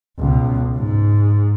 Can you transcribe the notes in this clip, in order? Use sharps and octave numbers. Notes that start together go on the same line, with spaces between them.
C#2 B2
G#2